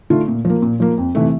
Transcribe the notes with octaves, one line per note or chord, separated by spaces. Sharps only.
D3 A3 D4 F4
A#2
F3 A#3
A#2
F3 A#3
F2
C3 E3 A3